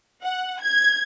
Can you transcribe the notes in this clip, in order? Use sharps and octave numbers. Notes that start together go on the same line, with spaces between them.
F#5
G#6